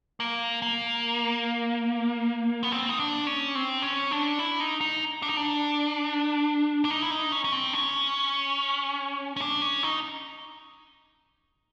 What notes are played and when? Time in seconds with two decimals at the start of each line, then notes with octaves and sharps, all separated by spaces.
0.20 A#3
0.62 A#3
2.63 B3
2.72 C4
2.89 D#4
3.00 D4
3.27 C#4
3.55 C4
3.82 C#4
4.11 D4
4.39 E4
4.60 D#4
4.81 D#4
5.22 D4
5.29 D#4
5.37 D4
6.85 D4
6.91 D#4
7.02 E4
7.11 D#4
7.32 C#4
7.44 C#4
7.52 C4
7.73 C#4
9.36 C#4
9.41 D4
9.61 C#4
9.83 D#4